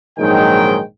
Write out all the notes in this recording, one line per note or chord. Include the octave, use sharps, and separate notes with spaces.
A#1 G#2 D#3 F#3 G#3 G5